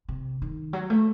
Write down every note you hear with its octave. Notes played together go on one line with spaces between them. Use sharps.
C3
D#3
F#3
A3